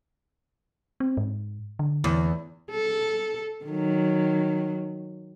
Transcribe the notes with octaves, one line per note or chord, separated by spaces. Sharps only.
C4
G#2
D3
E2
A4
D#3 F#3